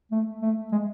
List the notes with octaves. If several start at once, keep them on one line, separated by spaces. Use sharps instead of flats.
A3
A3
G#3